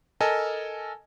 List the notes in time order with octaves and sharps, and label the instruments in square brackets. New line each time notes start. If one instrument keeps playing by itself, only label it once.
[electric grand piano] A4 A#4 D#5 G#5 A5